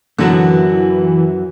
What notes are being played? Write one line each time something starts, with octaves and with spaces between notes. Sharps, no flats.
F#2 D3 E3 F#3 B3 F#4 A5